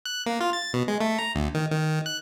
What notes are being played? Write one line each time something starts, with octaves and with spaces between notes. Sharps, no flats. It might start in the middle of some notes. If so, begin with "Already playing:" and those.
F#6
A#3
F4
A6
B2
G#3
A3
A#5
D2
D#3
D#3
F#6